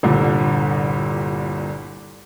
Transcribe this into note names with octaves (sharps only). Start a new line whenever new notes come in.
G1 C2 A#2 D3